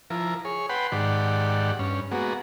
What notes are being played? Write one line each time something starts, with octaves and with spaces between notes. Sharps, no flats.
F3 E4 A#4
G#4 C#5
B4 F#5 G5 B5 C6
G#2 D#3 G4 D5 F#5
G2 C#4
G#3 A#3 B3 F#4